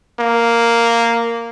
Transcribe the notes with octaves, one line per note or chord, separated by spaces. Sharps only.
A#3